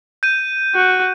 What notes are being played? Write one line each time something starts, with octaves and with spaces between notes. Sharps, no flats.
G6 D#7
F#4